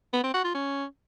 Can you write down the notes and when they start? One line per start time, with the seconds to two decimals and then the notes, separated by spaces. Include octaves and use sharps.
0.13 B3
0.24 C4
0.34 F#4
0.44 F4
0.54 C#4